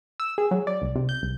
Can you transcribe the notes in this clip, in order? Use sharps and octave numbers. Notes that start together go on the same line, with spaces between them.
E6
G#4
F#3
D5
C2
C3
G6
C2